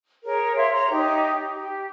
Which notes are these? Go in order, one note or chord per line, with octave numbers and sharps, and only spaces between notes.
G#4 A#4 C#5
C#5 E5 F5 C6
C#5 A#5 C6
D#4 G4
G4